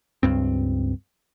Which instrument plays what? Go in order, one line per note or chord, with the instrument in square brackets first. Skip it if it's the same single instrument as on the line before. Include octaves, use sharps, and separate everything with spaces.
[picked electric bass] C#2 G2 C4